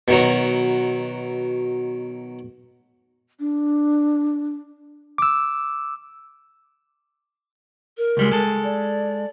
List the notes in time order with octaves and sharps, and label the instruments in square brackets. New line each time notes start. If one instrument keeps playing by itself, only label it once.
[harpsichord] B2 D#3 F#3
[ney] D4
[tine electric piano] D6 E6
[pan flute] A#4
[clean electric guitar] C#2 G3 G#3
G#3 A4
[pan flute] D5